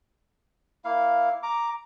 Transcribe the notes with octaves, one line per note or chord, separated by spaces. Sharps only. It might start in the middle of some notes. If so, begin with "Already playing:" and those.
A#3 E4 F5
A#5 D6